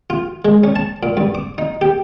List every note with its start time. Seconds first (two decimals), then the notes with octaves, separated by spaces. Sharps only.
0.10 F4
0.45 G#3
0.64 C#4
0.76 A5
1.03 A#2
1.17 G2
1.35 D6
1.58 D#4
1.81 G4